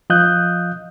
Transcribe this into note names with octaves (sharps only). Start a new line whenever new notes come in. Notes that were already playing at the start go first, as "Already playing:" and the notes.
F3 D#5 F5 D#6 F#6 G6